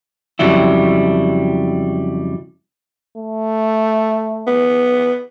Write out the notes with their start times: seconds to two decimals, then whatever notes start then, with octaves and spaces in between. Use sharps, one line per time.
0.39 F2 A#2 C#3 F#3 G3 E4
3.17 A3
4.47 B3